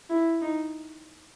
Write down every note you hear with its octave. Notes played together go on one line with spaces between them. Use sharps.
E4
D#4